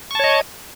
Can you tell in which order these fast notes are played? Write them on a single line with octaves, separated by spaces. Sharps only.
C#6 A5 C#5 D#5